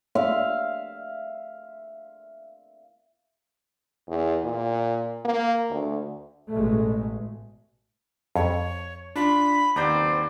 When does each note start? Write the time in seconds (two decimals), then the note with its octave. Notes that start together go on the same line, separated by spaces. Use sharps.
0.15 E5 F5
4.09 E2
4.44 A#2
5.25 A#3
5.70 D2
6.52 A1 B2 G#3 A3
8.36 F2 C#5
9.16 D4 F4 B5
9.76 D#2 B3 C4 C5 D5 A#5 G6